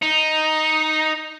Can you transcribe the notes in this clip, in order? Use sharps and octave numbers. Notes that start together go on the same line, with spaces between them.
D#4